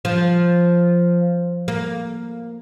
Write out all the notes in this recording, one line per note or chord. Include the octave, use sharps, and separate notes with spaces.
F3
A#3